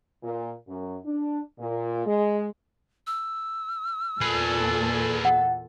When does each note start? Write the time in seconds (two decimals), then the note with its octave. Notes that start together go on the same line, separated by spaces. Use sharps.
0.23 A#2
0.67 F#2
1.05 D4
1.59 A#2
2.06 G#3
3.07 E6
4.21 E2 A#2 G#4 A4 B4
5.25 F#5